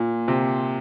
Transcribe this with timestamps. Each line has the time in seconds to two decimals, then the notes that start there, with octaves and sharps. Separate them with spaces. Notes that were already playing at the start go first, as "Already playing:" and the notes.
Already playing: A#2
0.28 C3